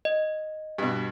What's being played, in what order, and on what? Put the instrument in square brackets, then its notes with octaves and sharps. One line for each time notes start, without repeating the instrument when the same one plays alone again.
[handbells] D#5
[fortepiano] G2 B2